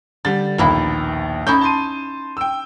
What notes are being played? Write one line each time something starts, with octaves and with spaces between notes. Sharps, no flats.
D3 G3 A6
A#1 D#2 B2 A#3 E4
C#4 D#4 E4 G6
A5 C6 D#7
G5 E6